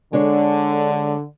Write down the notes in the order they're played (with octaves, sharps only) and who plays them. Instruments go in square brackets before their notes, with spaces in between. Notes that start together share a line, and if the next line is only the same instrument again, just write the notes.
[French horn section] D3 [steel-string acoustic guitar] G#3 D4 C#5